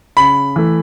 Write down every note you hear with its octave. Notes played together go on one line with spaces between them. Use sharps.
C#3 B5
E3 A3